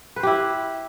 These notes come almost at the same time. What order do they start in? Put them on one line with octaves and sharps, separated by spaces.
B4 C5 G4 E4